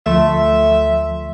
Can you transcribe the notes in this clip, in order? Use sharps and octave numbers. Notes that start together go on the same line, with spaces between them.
D2 F3 A3 E5 C6